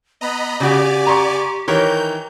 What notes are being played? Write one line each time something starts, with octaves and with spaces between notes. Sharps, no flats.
B3 D#5 A#5 B5
C#3 F#4 G4 D5 G#5 D6
A#5 C6 C#6
D#3 E3 A#4 C#5 G6